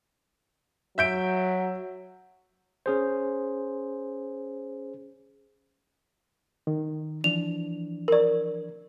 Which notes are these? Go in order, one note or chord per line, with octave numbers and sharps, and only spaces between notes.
F#3 E5 G6 D7
C#4 G#4 C5
D#3
E3 F3 D4 F7
A#4 D5